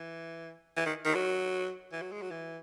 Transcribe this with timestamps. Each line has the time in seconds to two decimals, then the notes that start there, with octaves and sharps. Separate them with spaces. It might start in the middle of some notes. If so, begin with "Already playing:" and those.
Already playing: E3
0.77 E3
0.86 D#3
1.06 D#3
1.15 F#3
1.93 E3
2.02 F#3
2.12 G#3
2.22 F#3
2.31 E3